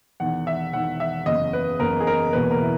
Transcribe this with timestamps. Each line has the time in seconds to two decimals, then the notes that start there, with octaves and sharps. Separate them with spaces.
0.20 E1 E2 D#3 F#5
0.47 E5
0.73 E1 E2 D#3 F#5
1.00 E5
1.26 F#1 E2 C#3 D#5
1.53 B4
1.79 F#1 E2 C#3 A#4
2.00 G#4
2.07 A#4
2.33 E1 E2 B2 A#3 B4
2.51 A#4
2.61 E4